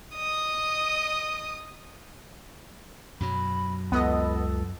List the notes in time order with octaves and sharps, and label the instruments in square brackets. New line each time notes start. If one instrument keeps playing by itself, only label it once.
[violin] D#5 D#6
[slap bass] F#2 B2 F#3 [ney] B5
[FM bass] C#2 [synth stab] B3 D#5 [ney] A4